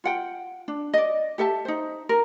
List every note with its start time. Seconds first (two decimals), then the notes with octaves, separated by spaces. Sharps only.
0.04 F4 F#5 G5
0.68 D4
0.93 D5 D#5
1.38 G4 A4 E5 A5
1.65 D#4 C5
2.09 A#4